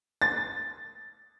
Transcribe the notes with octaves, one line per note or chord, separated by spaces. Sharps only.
A6